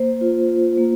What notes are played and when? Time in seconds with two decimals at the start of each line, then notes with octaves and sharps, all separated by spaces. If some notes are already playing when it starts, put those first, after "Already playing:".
Already playing: A#3 C5
0.21 F4
0.49 F4
0.77 A#3